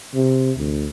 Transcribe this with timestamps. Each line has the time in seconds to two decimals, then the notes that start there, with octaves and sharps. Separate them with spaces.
0.14 C3
0.57 D2